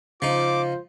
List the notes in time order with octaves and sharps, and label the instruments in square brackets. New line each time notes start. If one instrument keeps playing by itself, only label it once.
[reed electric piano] C#3 [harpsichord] F3 D#4 [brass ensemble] F4 C5 [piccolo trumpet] D6